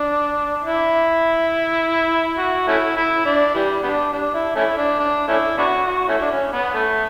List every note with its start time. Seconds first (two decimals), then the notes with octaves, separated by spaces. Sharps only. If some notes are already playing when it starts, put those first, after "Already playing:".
Already playing: D4
0.64 E4
2.38 F#4
2.68 A3 C#4 E4
2.96 E4
3.26 D4
3.55 E3 G3
3.83 G3 B3 D4
4.13 D4
4.34 E4
4.56 A3 C#4 E4
4.77 D4
4.99 D4
5.28 A3 C#4 E4
5.58 B3 D4 F#4
5.86 F#4
6.08 A3 C#4 E4
6.21 D4
6.31 C#4
6.53 B3
6.74 A3